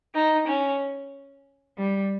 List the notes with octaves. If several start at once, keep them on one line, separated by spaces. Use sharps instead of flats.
D#4
C#4
G3